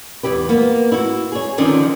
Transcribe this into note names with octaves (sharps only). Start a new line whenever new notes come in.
E2 B2 E4 G4 B4
A#3 B3
E4 F#4
G#4 C#5
D3 D#3 F3 C4 C#4 F4